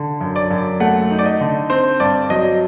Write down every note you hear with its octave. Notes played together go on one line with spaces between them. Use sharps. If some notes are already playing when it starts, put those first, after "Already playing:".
Already playing: D3
F#2
D5
F#2
A3 F#5
D#4
D5
D#5
D3
C4 C5
G2 D5
F#3 D#5